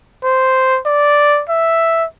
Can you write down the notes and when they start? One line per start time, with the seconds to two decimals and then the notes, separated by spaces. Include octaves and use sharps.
0.23 C5
0.86 D5
1.49 E5